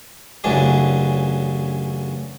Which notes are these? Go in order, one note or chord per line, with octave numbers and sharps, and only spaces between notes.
A1 F#2 C#3 E3 D4